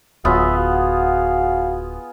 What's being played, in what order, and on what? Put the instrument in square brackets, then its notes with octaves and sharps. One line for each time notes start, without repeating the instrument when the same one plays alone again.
[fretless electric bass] D1 [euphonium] F#3 [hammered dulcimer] B3 F4 G#4 [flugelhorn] E5
[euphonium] F#4 [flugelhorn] F5